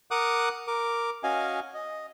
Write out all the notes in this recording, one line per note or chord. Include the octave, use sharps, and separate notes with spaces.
A#4 F#5 D6 D#6 F#6
A#4 D6
C#4 F#4 D#5 F5 G#5
D#5